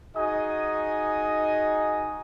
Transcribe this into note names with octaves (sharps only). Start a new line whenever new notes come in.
D#4 F#4 G#4 D#5 G#5 D#6